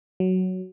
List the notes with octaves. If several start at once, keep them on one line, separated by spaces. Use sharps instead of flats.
F#3